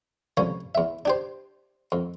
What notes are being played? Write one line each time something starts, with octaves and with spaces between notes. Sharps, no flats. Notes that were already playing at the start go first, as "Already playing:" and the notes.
C2 D3 F3 C#4
E2 E5
D4 G4 C5
F2